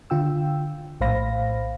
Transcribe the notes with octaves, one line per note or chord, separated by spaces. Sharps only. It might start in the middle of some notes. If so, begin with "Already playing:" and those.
D3 F4 G5 E6
A#1 A2 C5 F5 B5 A#6